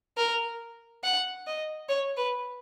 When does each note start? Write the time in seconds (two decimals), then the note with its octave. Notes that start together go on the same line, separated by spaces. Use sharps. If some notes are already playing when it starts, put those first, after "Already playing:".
0.18 A#4
1.03 F#5
1.47 D#5
1.89 C#5
2.17 B4